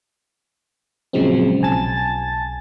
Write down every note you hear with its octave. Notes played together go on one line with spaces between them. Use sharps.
A#2 C#3 F3 F#3 G#3 C4
B1 G#5 A5 A6